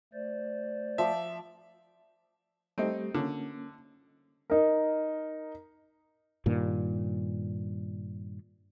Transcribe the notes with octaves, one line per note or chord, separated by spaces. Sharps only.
A3 C5 D5
F3 E5 D6
G3 A3 C4 D#4 G4
D3 A#3 C#4
D#4 A#4
G2 A#2 D#3